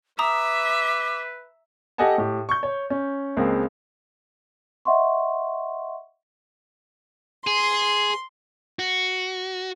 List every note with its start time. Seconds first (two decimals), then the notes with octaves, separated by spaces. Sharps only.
0.19 B4 E5 A#5 D6 D#6
1.98 G4 A4 D#5 F#5 G#5 A5
2.18 A2 G4
2.49 C#6 G6
2.63 C#5
2.90 C#4
3.37 C#2 G#3 A#3 C4
4.85 D#5 E5 F#5 C6 C#6
7.47 G#4 C6
8.79 F#4